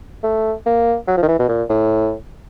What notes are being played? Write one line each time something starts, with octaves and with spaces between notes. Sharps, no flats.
A3
A#3
F#3
F3
D#3
E3
B2
A#2
A2